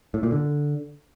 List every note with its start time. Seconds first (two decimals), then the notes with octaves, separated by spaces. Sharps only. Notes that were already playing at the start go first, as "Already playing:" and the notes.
0.14 A2
0.23 A#2
0.32 D3